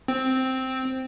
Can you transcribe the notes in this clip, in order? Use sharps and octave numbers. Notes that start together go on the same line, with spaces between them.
C4